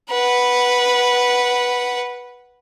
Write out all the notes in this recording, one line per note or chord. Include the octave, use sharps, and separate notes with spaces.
B4 F#5